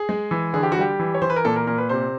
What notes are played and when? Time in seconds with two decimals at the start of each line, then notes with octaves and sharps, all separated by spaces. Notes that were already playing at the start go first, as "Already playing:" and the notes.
Already playing: G#4
0.09 G#3
0.31 E3
0.54 D3 G#4
0.63 G4
0.72 F#4
0.76 G3 G4
1.00 E3
1.15 C#5
1.22 E3 C5
1.30 B4
1.36 A#4
1.45 A#2 A4
1.56 A#4
1.67 A#2 A#4
1.78 B4
1.89 C3 C5